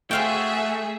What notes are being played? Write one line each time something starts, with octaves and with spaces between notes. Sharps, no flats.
A3 F#4 G#4 C5 E5 F5 G5